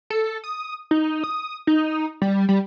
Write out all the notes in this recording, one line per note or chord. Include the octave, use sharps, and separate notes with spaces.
A4
D#6
D#4
D#6
D#4
G3
G3